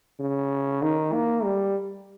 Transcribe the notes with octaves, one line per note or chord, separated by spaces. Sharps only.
C#3
D#3
A#3
G3